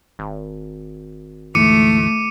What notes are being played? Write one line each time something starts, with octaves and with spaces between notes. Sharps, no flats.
G#1
D2 G#2 E3 A3 D6 C#7 D#7